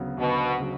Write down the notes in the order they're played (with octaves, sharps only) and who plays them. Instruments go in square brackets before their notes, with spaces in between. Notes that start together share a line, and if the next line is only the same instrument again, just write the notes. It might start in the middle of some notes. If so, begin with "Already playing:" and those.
Already playing: [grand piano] D2 C#3 F#3 B3
[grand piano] D2 [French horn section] B2
[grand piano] C#3 F#3